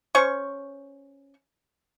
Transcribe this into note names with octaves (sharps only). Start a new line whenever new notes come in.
C#4 C5 C#6